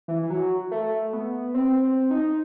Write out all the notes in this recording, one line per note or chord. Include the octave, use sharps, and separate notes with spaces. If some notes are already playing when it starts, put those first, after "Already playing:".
E3
E3
F#3
A3
B3
C4
C4
D#4